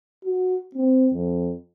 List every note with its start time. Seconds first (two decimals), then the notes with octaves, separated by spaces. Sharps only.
0.25 F#4
0.75 C4
1.13 F2